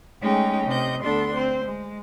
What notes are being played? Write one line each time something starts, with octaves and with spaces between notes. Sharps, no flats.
G#3 A3 C#4 D#4 G#4 G5
C3 D#5 G6
D2 B3 D4 A4 C6
C4 C5
G#3